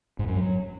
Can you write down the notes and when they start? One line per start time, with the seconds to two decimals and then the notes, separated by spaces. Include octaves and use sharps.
0.19 G#2
0.28 F#2
0.36 F#3